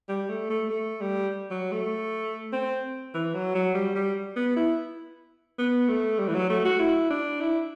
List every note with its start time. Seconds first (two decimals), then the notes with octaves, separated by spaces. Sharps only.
0.09 G3
0.30 A3
0.50 A3
0.70 A3
1.01 G3
1.51 F#3
1.72 A3
2.53 C4
3.14 E3
3.34 F#3
3.55 F#3
3.75 G3
3.95 G3
4.36 B3
4.56 E4
5.58 B3
5.88 A3
6.19 G3
6.28 E3
6.34 F#3
6.50 A3
6.65 F#4
6.79 E4
7.11 D4
7.41 E4